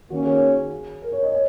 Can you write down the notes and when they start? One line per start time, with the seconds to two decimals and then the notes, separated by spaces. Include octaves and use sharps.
0.10 D#3 A#3 C#4 F#4
0.25 G#4
1.02 A#4
1.12 C#5
1.23 D#5
1.32 C#5